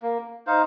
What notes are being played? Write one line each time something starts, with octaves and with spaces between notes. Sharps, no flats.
A#3
D#4 C5 F5